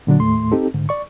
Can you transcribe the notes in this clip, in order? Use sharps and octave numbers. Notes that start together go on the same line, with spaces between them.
A#2 D3 F#3 D4
D#2 A2 A3 C6
C4 D#4 G4 A4
G#2 D3
D5 C#6